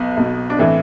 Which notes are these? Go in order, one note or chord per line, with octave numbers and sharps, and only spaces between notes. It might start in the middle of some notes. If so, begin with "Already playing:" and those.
Already playing: B1 B2 B3
B1 B2
D4
A2 E3 C4